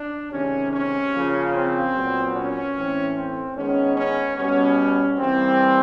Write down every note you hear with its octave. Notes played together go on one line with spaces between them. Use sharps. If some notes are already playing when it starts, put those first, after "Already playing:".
Already playing: D4
C3 D#3 G#3 C#4
C#4
C#3 F3 A#3
C4
A#2 F#3 B3
C#4
A2 E3 A3 C4
C4
D#3 G#3 B3 C#4
C#4
B2 G3 B3 C#4
E3 G3 A#3 C4